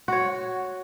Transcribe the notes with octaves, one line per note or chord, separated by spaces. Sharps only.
F#4 C#5